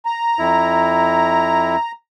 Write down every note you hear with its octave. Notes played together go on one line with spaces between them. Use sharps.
A#5
F2 E4